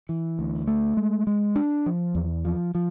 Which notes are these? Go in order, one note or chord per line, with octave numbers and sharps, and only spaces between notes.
E3
D2
A3
G#3
G#3
D4
F3
E2
F3
F3